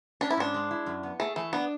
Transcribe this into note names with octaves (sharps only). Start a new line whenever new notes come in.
C#4 D4
E4
G#2 D4
G#3
E4
F#2
B3
A3 G#4
E3 A3
B3 D4